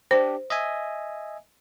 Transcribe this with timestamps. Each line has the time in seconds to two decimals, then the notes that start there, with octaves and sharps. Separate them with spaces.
0.11 D4 G4 C5
0.50 D#5 E5 G#5